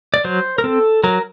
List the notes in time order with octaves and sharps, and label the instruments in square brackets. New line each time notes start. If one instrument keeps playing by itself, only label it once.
[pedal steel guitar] D5
F#3 C5
A#4
C4 A4
F#3 A#4